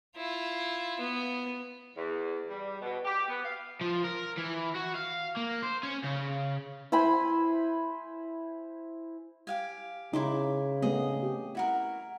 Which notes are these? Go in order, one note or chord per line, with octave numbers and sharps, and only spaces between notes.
E4 F4
B3
E2
G3
B2
G4
B3
F5
F3
A#4
E3
F#4
F5
A#3
C5
C#4
C#3
E4 C5 G#5 B5
G4 F5 G#5
C#3 D#4 E4 C6 D6
A3 B3 C4 G#4 D#5
G4
E4 F#4 A#4